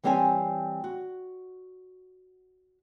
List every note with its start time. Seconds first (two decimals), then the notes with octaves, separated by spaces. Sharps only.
0.03 E3 G3 C4 C#5 F5 G#5
0.84 F#4